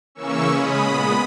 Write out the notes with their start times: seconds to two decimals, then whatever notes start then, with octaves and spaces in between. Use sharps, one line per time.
0.15 C#3 E3 A#3 C#4 C#6 E6
0.48 C#3 G#3 C#4 B5 D#6
0.82 A#2 G#3 B3